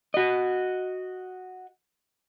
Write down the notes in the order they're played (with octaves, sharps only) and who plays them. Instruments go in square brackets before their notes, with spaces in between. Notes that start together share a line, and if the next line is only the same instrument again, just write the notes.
[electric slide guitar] F#4 D#5